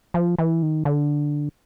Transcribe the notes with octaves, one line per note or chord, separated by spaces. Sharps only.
F3
E3
D#3
D3